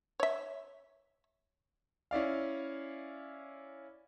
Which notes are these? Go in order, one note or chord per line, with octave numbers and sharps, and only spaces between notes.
C#5 E5
C#4 E4 D5 F5